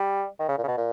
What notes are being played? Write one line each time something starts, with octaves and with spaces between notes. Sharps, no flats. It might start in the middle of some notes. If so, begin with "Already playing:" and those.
Already playing: G3
D#3
C#3
A#2
C#3
B2
A#2